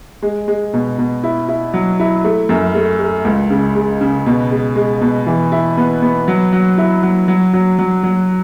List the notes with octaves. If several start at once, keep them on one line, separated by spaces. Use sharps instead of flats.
G#3
G#3
B2
B2
E4
E4
F#3
E4
A3
F#2
A3
A3
C#2
C#3
G#3
C#3
B2
G#3
G#3
B2
E3
E4
B3
B3
F#3
F#3
E4
F#3
F#3
F#3
F#3
F#3